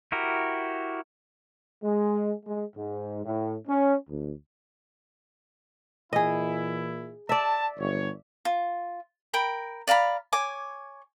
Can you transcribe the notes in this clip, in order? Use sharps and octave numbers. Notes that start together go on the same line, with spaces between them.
E4 F#4 G4 A#4
G#3
G#3
G#2
A2
C#4
D2
A#2 E3 E4 G#4 D#5
D5 E5 A5
G1 C#5
F4
A#4 G5 B5
D5 F5 A#5 B5
C#5 G#5 D6